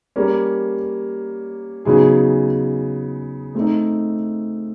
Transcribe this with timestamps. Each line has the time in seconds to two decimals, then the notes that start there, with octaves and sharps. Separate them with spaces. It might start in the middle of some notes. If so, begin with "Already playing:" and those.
0.16 G3 A#3 C#4
1.85 C#3 F#3 B3 D#4 G#4
3.55 A3 C4 D#4